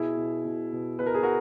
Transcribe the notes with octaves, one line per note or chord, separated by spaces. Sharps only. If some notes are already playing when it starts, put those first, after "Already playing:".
Already playing: B2 E4 G#4
B2
B2
B2
B2 B4
A#4
G#4
F#4 A#4